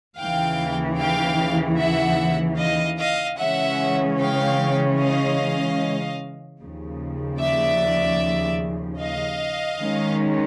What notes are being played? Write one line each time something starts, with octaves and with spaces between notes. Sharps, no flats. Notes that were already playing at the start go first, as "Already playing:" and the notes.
D#2 C#3 E3 F5 G5
F5 G5
E5 F#5
D#5 F5
D#5 F5
C#3 E3 G#3 C#4 E5 F#5
F5 G5
D#5 F5
D#2 C#3 F3
D5 E5
D#5 F5
D#3 G#3 C#4